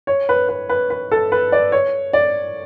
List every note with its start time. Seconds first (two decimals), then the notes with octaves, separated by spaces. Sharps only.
0.07 C#5
0.29 B4
0.49 B4
0.69 B4
0.90 B4
1.12 A4
1.32 B4
1.52 D5
1.72 C#5
2.13 D5